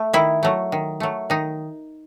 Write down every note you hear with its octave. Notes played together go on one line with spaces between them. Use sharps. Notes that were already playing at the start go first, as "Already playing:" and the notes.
Already playing: A3
D#3 E4
F#3 A3
D#3
F#3 A3
D#3 D#4